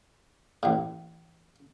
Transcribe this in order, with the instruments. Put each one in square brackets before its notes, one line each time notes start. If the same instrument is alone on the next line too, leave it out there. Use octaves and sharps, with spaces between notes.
[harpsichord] A1 A2